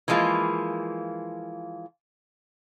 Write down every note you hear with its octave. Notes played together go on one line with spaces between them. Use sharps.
E3 F3 G#3 A#3 F4